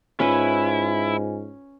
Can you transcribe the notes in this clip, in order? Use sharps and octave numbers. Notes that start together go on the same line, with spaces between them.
G#2 C#4 E4 F4 B4 G#5